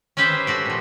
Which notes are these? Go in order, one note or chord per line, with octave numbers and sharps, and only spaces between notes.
C#4 G4 B4 C5 E5 G5
A3 F#4 G4
A#2 F3